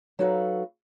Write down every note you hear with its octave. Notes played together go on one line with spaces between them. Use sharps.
F#3 D#4 F#4 A4 B4 F5